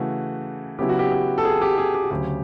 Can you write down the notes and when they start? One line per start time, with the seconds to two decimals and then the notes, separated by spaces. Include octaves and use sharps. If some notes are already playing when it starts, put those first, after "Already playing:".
Already playing: C#3 E3 A3 F#4
0.79 C#3 F#3 B3 E4 G4
0.89 F#4
0.99 G4
1.12 G4
1.38 A4
1.45 G#4
1.61 G4
1.78 G#4
1.94 G4
2.03 F#4
2.11 D2 C#3 F#3 G4